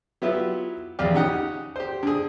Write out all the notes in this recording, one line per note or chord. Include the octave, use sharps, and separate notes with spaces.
F#3 B3 E4 F4 G4
A#1 E2 G4 D5 F5
C#3 C#4 D#4 G4 F#5
G4 C5
D3 G#4